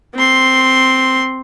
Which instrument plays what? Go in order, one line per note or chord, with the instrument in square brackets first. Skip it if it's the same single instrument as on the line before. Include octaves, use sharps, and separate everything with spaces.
[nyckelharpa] C4 C6